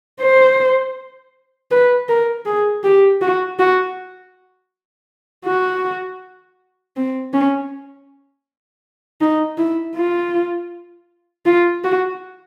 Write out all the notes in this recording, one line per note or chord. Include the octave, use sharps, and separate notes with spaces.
C5
B4
A#4
G#4
G4
F#4
F#4
F#4
C4
C#4
D#4
E4
F4
F4
F#4